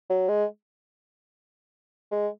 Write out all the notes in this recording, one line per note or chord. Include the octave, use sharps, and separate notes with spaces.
F#3
G#3
G#3